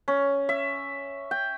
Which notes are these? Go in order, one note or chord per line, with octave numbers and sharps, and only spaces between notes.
C#4
E5
G5